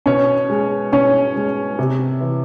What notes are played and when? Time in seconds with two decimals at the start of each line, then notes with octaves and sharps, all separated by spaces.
0.06 B2 C#4 C#5
0.50 G#3
0.92 B2 C#4 C#5
1.36 G#3
1.79 C3
2.21 E3